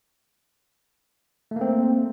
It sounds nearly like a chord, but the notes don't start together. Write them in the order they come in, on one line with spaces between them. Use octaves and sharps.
A3 A#3 C4